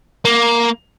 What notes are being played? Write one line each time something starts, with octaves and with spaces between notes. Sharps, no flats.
A#3